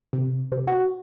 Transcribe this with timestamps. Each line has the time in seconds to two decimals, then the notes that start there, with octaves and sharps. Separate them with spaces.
0.13 C3
0.52 C3
0.67 F#4